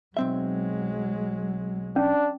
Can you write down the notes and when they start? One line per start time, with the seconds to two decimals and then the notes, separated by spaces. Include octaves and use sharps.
0.17 B1 F#3 G#3 C4 E5
1.96 C#4 D4